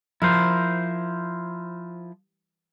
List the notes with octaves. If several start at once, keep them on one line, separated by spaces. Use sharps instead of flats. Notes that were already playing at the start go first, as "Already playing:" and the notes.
F3 E4 A#4 C5